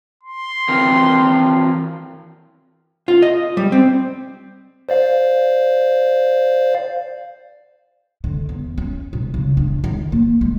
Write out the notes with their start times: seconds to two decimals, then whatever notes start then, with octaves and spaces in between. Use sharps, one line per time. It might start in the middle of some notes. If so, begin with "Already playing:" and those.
0.23 C6
0.69 E3 C4 A#4
3.08 F4
3.22 D#5
3.57 G3
3.72 C4
4.89 C5 D5 F5
8.24 D3
8.49 E2
8.78 C#4
9.13 B2
9.34 C#3
9.57 D4
9.84 D#3
10.12 A#3
10.41 G#3